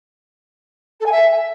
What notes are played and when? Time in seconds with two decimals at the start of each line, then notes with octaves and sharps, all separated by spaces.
1.00 A4
1.06 G#5
1.11 E5